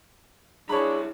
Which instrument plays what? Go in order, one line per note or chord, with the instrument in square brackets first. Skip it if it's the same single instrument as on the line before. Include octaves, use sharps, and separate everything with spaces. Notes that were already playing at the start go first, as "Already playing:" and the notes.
[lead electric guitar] G3 E4 [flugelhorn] D4 [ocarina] G#4 [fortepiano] C#5 B5